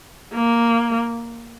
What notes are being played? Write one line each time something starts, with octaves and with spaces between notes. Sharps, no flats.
A#3